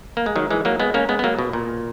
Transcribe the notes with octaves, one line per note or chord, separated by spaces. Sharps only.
A#3
G#3
D#3 F#3
E3 G#3
F#3 A#3
G#3 B3
A#3 C#4
G#3 B3
B3
F#3 A#3
B2
A#2